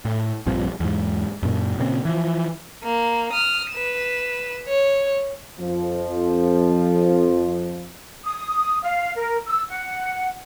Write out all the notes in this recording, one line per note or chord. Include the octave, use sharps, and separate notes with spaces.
A2
A#1 G2 F3 C4
E2 G#2
F#2 A#2
A#2 C#3 A#3 C4
E3 F3
A#3
D#6 F6
B4 E7
C#5
F2 F3
D#6
F5
A#4
E6
F#5